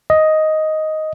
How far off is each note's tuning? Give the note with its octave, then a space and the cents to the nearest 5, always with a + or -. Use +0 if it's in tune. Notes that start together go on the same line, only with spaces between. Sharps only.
D#5 +5